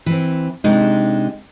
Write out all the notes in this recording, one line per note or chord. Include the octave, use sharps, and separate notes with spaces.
E3 C4
C3 G#3 D4 D#4